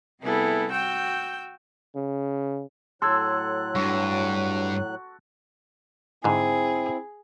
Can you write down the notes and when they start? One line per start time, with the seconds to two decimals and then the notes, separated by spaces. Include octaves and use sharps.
0.21 C3 G3 B3 E4 G#4 A4
0.71 F#4 G5 E6 G6
1.95 C#3
3.02 A2 F#3 A4 C6 E6 F#6 G#6
3.75 G2 F#4
6.24 G#2 D3 C4 E4 G#4